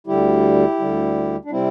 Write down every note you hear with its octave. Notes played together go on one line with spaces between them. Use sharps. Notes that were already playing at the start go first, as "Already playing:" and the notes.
D2 D3 G3 E4 G4
D2 D3 G3
D4
C3 G3 C4 E4